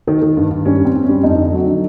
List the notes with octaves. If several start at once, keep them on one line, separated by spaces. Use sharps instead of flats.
D#3
D#3
G2
G2
G3 C#4
G2
C4
G2
C#4
G3
F2 D#4
D3
F#3
D#4
D3